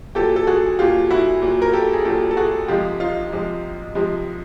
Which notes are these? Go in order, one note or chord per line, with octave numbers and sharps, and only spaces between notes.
A#2 F#3 G4 A4
A4
F#4 G#4
A#2 F#3 F4 G4
E4 F#4
A#2 F#3
A#4
G4 A4
G#4
A#2 F#3 G4 A4
A4
F#4 G#4
C3 F3 G#3 F4 G4
D#4 F4
C3 F3 G#3
C3 F3 G#3